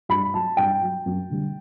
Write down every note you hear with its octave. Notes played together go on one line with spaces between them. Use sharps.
G2 B5
F#3 A5
G2 G5
F#3
F#2
D3 G3